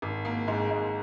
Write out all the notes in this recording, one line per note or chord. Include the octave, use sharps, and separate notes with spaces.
G#1
A#3
G#2
G#2